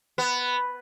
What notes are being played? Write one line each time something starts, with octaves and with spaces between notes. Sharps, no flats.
B3